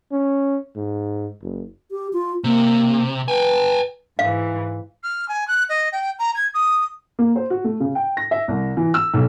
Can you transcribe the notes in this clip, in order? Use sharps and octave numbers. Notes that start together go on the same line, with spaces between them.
C#4
G#2
F#1
G4
F4
C3 A#3
B4 G5 G#5
G#2 E3 F5
F6
G#5
F#6
D#5
G5
A#5
G#6
D#6
A#3
C5
F#4
A3
C#3
G5
A#6
E5
C2
E3
E6
B1